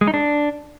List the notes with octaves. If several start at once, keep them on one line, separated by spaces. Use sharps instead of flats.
G#3
D#4
D4